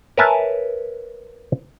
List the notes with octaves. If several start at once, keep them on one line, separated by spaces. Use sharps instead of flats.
A#4 B4 C#5 E5 G#5 A5